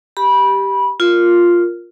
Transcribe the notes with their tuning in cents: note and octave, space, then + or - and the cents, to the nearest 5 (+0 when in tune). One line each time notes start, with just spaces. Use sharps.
G4 +0 B5 -20
F4 +0 A#4 +0